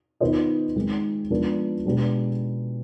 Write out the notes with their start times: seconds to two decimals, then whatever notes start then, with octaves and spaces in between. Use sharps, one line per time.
0.20 D#3 B3 F4 C5 D#5
0.76 D#3 G#3 C4
1.30 F3 G#3 B3 D4
1.86 B2 G#3 D4 G4 B4